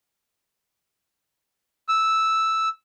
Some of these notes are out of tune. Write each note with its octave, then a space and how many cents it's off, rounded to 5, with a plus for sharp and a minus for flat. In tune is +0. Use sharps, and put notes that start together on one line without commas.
E6 -5